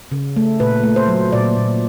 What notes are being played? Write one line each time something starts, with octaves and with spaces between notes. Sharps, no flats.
C#3
A3
A#2 B4
A3
C5
F#3
A#2 D5
A#2